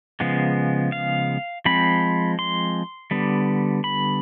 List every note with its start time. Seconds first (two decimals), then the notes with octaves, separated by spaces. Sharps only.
0.20 C#3 F3 G#3 B3
0.92 F5
1.65 F3 G#3 C4 B5
2.39 C6
3.11 D3 G3 B3
3.84 B5